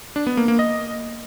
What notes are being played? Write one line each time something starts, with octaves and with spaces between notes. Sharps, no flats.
D4
B3
A#3
A#3
D#5